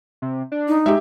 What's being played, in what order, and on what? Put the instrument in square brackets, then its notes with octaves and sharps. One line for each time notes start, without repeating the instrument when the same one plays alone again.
[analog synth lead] C3
D4
[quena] D#4
[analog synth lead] G#3 [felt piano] G4 E5